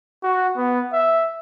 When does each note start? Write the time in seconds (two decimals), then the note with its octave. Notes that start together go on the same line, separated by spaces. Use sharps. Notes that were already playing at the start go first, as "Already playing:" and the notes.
0.23 F#4
0.57 B3
0.93 E5